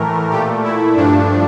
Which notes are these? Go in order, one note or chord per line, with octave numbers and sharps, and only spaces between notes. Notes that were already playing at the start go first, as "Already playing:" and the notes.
Already playing: A2 E3 A3 A#4
A#2 A3 G4
E4
G2 F3 A3 D4